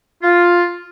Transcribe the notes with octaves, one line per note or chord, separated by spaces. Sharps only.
F4